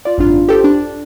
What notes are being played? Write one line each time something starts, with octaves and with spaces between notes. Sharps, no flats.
F4 D5
G#1 F#2 D4 F4
G4 A4 C5
D4